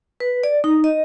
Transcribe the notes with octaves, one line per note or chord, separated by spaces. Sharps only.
B4
D5
D#4
D#5